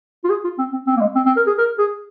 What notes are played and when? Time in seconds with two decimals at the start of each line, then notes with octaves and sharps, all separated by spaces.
0.24 F4
0.30 G#4
0.44 F4
0.58 C4
0.73 C4
0.87 C4
0.96 A#3
1.01 G#3
1.15 C4
1.26 C4
1.37 A#4
1.47 G#4
1.58 A#4
1.78 G#4